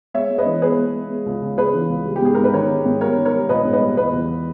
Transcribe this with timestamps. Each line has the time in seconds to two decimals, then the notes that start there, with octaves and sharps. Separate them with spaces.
0.14 G#3 C#5 E5
0.30 G#3
0.38 B4 D#5
0.46 E3
0.62 G#3 G#4 B4
0.79 G#3
0.94 G#3
1.10 G#3
1.26 C#2
1.42 C#2
1.58 G#3 G#4 B4
1.74 E3
1.90 C#2
2.06 G3
2.16 G4
2.22 G#2 G#4
2.35 G#2 A#4
2.44 B4
2.53 D#3 A#4 C#5
2.70 D#3
2.85 G#2
3.01 G3 A#4 C#5
3.17 D#3
3.25 A#4 C#5
3.34 G3
3.49 A#1 B4 D#5
3.65 G#2
3.73 B4 D#5
3.82 G3
3.97 E2 B4 D#5
4.13 E2